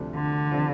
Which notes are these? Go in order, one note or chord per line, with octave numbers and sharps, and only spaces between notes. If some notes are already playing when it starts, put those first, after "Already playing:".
Already playing: D2 C3 F3 A3 D4
D3
C3 F3